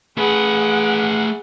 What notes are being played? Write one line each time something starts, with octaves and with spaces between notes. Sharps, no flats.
A3 G#4 B4 F#5